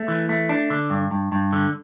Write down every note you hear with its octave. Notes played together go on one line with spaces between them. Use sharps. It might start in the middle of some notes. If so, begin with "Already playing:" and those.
Already playing: A3
E3
A3
D4
D3
G2
G2
G2
D3